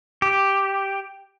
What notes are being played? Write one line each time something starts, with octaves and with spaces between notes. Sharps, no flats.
G4